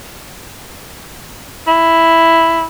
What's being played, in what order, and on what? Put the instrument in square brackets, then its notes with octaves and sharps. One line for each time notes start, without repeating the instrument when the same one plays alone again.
[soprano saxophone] E4